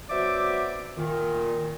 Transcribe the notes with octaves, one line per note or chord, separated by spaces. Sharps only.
F#3 B3 C5 D5 E5 D6
A#2 D#3